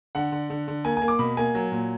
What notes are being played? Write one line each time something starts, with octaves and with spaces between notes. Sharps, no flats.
D3 F#5
D3
D3
D3
A#3 G#5
A#3 G#5
D6
B2 B5
A#3 G#5
F#3
A#2